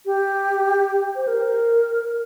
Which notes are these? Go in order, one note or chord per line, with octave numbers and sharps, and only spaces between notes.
G4
C5
A#4